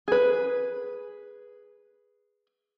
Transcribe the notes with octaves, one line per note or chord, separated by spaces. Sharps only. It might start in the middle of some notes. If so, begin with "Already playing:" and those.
G#4 B4